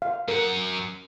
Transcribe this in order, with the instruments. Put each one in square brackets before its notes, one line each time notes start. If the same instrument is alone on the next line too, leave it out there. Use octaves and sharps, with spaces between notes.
[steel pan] F5
[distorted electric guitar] F#2 F#5 [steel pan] A#4